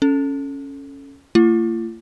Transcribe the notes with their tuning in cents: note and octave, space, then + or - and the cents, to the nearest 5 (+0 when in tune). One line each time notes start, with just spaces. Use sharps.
C#4 +0 A4 +0
A3 +45 F4 -45